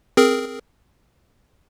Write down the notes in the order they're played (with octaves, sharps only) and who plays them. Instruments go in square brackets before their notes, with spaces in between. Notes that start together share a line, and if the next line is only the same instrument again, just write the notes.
[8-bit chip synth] C4 G#4 A#4